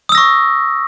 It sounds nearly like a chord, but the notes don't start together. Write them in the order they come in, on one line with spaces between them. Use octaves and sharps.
D#6 E6 A#6 C#6